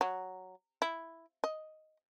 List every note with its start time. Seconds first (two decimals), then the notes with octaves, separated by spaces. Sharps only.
0.01 F#3
0.82 E4
1.44 D#5